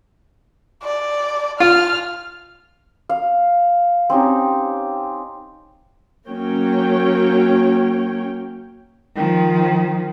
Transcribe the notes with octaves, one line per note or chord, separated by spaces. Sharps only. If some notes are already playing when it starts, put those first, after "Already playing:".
D5
F4 F6
F5
C4 C#4 D#4 G4
F#3 A#3 C#4 C#5 G5
D#3 F3